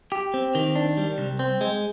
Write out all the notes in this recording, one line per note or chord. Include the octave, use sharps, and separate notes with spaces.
G4
C4
D#3
D4
G3
C2
C4
G#3